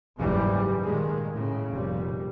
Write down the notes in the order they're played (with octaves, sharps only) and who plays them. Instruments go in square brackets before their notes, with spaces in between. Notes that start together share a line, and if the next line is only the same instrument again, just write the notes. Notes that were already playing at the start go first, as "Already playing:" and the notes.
[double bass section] F#1 D#2 G#2 C#3 E3 G3
A#2 D#3 G#3
A2 C#3
F1 A#2 G3